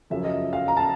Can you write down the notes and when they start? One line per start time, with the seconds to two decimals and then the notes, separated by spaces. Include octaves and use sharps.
0.10 F#2 C#3 F3 E5
0.24 D#5
0.53 F5
0.68 A#5
0.77 A5